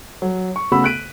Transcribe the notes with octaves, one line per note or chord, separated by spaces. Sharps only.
F#3
C#6
C#3 A3 B3 F#4 B5 E6
F#6 B6 D7 D#7